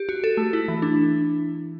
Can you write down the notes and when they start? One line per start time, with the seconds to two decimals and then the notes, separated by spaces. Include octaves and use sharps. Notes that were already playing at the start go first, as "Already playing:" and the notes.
Already playing: G4
0.09 F#4
0.24 A4
0.37 A3
0.53 E4
0.68 E3
0.82 D4